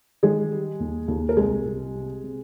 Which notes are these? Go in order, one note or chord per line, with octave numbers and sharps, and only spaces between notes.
D#3 G#3 G#4
G3
D#2
D#2
A#4
C2 G#3 G#4
C2
C3
C3